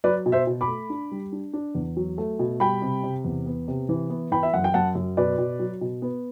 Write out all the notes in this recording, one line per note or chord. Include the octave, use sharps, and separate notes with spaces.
F#3 B4 D5
B2
C5 E5
B2
B5 D6
A3
D4
G3
D4
D4
E2
F#3
A3
B2
G3 G5 B5
C3
C3
E2
B3
C3
E3
B3
E3 G5 B5
E5
F#2 F#5
G5
F#2 F#5 A5
F#2
B2 B4 D5
B2
F#3
B2
B3